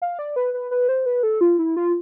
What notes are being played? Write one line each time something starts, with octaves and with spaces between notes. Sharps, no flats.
F5
D5
B4
B4
B4
C5
B4
A4
F4
E4
F4